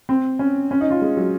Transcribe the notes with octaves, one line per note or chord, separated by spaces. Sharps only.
C4
C#4
C#4
D#4
F4
G#3
F#3